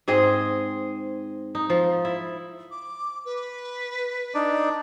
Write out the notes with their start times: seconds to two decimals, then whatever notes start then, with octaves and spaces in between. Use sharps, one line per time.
0.08 G#2 C4 G#4 D#5
1.55 D#4
1.70 F3
2.05 E4
2.71 D6
3.25 B4
4.35 D4 D#4 D5